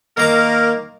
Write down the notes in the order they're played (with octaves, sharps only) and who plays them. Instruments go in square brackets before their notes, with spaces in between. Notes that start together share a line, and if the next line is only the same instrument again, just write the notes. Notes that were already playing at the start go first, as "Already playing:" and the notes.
[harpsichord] D#3 A#5 D6 [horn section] A#3 A#4